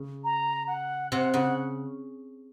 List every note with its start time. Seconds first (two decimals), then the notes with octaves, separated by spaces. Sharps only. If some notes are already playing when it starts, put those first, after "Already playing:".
Already playing: C#3
0.24 A#5
0.67 F#5
1.12 C3 F#5
1.33 C#3 F#5